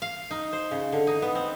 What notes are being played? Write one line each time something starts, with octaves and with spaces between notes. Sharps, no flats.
F5
D#4
C5
C#3
D3
D#4
B3
C4